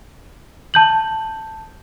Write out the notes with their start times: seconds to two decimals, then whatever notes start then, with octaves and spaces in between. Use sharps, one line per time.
0.74 A5 G6 F#7